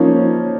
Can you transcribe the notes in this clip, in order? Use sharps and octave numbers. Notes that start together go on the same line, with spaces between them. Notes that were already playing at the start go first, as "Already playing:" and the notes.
Already playing: F3 A#3 C#4 D#4 C#5